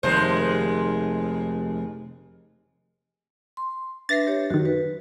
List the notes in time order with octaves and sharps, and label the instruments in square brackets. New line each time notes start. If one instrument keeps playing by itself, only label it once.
[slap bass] F1 [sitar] D#2 G#3 C5
[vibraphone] C6
[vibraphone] D4 B4 E5 [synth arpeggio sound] A6 A#6 C7
[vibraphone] G4 C#5
[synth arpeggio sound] F#2 D#3 [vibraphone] F#4
[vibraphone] B4